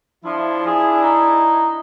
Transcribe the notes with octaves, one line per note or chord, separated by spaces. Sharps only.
F3 D4 E4
G#4
D#4